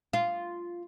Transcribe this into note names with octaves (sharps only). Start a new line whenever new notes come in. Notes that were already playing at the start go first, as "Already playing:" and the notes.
F4